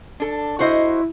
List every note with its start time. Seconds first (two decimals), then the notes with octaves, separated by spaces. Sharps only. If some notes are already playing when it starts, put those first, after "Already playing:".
0.20 D4 A4
0.59 E4 F#4 C5 D#5